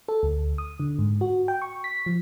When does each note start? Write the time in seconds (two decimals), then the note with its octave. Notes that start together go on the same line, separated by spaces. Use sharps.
0.08 A4
0.23 D2
0.58 D#6
0.80 D3
0.99 G#2
1.21 F#4
1.48 G5
1.62 C#6
1.84 B6
2.06 F3